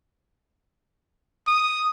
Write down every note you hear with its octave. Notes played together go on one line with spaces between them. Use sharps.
D#6